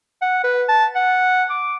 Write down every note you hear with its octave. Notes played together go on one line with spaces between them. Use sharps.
F#5
B4
A5
F#5
D6